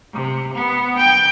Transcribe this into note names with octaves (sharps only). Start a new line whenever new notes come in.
C3
B3
G5